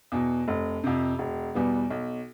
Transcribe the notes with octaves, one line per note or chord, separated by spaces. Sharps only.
E2 B2
F1
F2 C3
E1
E2 B2 G3 B3
B1